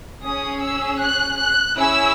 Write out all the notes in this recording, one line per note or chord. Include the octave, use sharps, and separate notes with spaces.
C#4 G#4 D#6
E6
F#6
F#6
C#4 E4 G#4 E6